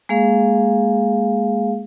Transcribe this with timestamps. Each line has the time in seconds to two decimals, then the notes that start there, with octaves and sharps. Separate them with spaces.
0.09 G#3 A#3 G#4 F5